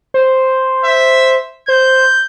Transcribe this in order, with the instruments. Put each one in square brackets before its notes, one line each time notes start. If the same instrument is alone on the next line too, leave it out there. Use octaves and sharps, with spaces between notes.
[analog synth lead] C5
[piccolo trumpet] E5
[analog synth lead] C5 [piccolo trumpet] G6